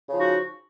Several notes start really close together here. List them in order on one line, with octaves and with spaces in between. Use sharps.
C#3 F3 D#4 F#4